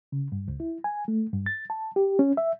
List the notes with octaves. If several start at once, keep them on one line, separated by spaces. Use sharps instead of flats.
C#3
G2
C#2
E4
G#5
A3
G2
A6
A5
G4
C#4
E5